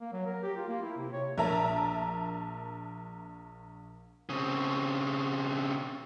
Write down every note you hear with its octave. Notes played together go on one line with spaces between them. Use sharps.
A#3
F#3
A#4
G4
F4
A#3
E4
C3
C#5
A#1 A#4 E5 A5 A#5
C#3 C4